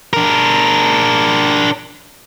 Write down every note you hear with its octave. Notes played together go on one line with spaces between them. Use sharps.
D4 A#4